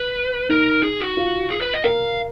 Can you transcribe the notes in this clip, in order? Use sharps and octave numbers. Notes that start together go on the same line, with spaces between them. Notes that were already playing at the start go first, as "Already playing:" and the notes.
Already playing: B4
D#4 A#4
G#4
F#4
F4
G#4
B4
D#5
A#4 F5